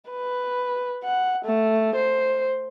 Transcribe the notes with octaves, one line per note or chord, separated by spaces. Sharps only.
B4
F#5
A3
C5